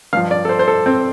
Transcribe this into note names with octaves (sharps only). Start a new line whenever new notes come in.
G2 F3 F5
D5
A4
C5
C5
A4
C4